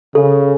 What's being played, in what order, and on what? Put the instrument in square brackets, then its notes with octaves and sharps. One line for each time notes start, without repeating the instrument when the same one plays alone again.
[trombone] C#3 [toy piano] A4